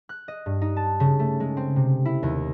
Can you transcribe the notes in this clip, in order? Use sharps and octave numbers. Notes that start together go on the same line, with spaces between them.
F#6
D#5
G2
D#4
A5
C#3
A3
G#3
C4
C3
E4
D#2